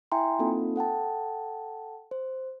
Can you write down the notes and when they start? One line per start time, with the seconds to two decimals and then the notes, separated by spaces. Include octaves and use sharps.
0.12 E4 E5 G5 G#5 A#5 C6
0.39 A#3 C4 D#4 F4 A4
0.76 A4 F#5 G5 A5
2.11 C5